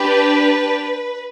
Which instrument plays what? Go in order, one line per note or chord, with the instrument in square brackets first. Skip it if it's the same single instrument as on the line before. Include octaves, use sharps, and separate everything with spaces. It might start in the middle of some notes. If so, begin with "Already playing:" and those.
Already playing: [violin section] D4 G4 B4